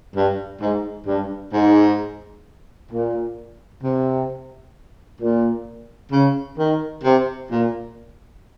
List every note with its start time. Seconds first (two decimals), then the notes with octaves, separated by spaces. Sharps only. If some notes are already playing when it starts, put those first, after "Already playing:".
0.15 G2
0.61 G#2
1.07 G2
1.53 G#2
2.91 A#2
3.83 C3
5.21 A#2
6.12 C#3
6.58 D#3
7.04 C3
7.51 A#2